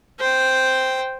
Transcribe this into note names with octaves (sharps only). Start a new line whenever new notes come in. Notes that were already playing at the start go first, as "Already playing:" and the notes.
C5 G5